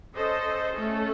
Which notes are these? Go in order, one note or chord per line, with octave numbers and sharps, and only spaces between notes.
C#4 A4 C5 D#5
A3 C#4 A4